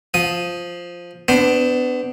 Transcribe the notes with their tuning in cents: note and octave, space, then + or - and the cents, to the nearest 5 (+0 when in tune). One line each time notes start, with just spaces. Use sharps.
F3 +0 D#6 +0
B3 +30 D4 +0 C5 +0